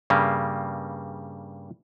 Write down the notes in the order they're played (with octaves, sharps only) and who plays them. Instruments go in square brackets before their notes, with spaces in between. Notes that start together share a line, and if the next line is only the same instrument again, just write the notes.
[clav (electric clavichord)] G2 C#3 G3 A#3